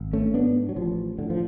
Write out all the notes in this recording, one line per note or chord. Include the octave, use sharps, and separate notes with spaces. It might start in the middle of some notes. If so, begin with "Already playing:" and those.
Already playing: G#1
A3 C#4
G#2 B3 D4
F#3
A1 F3
A2 D3
F3